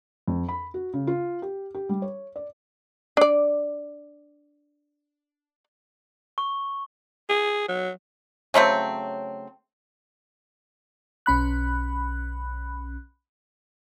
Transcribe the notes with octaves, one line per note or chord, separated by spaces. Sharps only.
F2
B5
F#4
C#3
F4
G4
G4
G3
C#5
D5
D4 D5
C#6
G#4
F#3
C#3 F#3 A3 C4
B1 C#4 B5 F#6